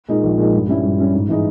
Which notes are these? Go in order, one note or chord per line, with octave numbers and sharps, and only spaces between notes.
A#2 G#3 D#4
A#1
A#2 G#3 D#4
G2
G3 C#4 E4
G2
G3 C#4 E4
G#2
E3 G#3 D#4